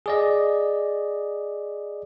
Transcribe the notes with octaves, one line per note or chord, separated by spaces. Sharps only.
G#4 D5 D#5